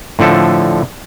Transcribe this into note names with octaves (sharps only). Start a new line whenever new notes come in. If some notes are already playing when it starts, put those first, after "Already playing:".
A2 D3 F3 A4